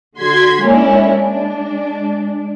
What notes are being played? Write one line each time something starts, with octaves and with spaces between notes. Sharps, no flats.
D3 F#4 C6 G#6 B6
G#3 A#3 C#4 D4 E4
G#3 D4